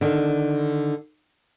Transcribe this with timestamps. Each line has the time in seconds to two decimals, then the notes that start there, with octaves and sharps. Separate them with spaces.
0.01 D3 D#3